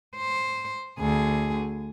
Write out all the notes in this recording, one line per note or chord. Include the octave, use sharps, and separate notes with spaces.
C5
D2 G#4